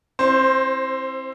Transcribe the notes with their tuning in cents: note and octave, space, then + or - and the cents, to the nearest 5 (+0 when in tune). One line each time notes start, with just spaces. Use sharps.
C4 +30 E4 +0 C5 +0